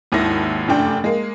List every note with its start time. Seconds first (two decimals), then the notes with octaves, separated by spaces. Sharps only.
0.12 G#1 D#2 D#3 E4 A#6
0.68 F1 F#2 A3 D4 G5
1.04 G#3 A#3